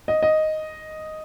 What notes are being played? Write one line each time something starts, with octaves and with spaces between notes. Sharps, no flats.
D#5
D#5